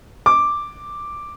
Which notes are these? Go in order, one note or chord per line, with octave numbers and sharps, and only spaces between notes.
D6